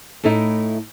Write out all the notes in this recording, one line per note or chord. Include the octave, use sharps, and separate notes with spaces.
A2 A3 D#4 E4